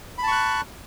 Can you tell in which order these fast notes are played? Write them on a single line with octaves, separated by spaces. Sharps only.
B5 A5 C#6 F#6